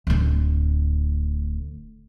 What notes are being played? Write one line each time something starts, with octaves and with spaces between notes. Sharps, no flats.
D1 D2